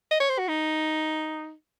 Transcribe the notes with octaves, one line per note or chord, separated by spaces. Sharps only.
D#5
C#5
C5
F#4
D#4